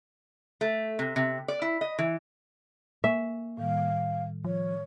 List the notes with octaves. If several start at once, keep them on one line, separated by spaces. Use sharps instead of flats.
A3
C3
C3
D5
E4
D#5
E3
A#3 E5 G#5 C#6
A2 D#3 G3 F5
F3 C#5